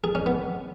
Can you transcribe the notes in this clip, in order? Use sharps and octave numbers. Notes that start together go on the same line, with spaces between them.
G#4
C#4
B3